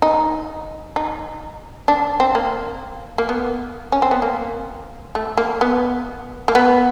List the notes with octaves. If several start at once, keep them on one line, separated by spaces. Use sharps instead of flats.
D#4
D#4
D4
C4
A#3
A#3
B3
C#4
C4
B3
A#3
A3
A#3
B3
A#3
B3